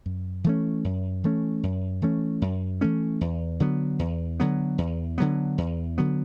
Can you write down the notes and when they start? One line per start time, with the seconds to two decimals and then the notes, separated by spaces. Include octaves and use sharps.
0.06 F#2
0.44 E3 A3 C#4
0.84 F#2
1.24 E3 A3 C#4
1.63 F#2
2.02 E3 A3 C#4
2.42 F#2
2.81 E3 A3 C#4
3.21 E2
3.60 D3 F#3 B3
3.99 E2
4.40 D3 F#3 B3
4.78 E2
5.18 D3 F#3 B3
5.58 E2
5.98 D3 F#3 B3